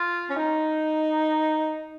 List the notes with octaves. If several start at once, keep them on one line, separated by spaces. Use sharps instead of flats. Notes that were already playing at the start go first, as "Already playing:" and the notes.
Already playing: F4
C#4
D#4